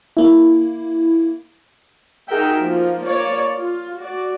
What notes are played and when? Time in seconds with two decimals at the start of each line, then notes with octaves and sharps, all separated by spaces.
0.17 A#3 E4
2.28 D#4 F#4 G#4 A#4 E5 G5
2.60 F3 A#3
3.05 A#3 C#5 D5
3.54 F4
3.98 F#4 D5